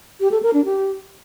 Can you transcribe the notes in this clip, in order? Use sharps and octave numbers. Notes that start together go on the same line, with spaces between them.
G4
A4
A#4
D4
G4